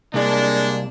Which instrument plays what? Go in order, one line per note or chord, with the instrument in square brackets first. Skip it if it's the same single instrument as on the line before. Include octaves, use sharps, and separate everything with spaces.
[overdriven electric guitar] C2 [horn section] G#3 A#3 D4